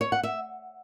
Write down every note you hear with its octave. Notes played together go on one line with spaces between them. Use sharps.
C#5
F#5
E5